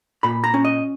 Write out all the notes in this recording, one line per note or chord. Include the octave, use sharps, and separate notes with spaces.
A#2 B5
A#5
C#4
D#5